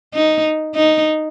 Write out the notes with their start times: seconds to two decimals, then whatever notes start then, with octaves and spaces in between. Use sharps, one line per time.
0.14 D#4
0.75 D#4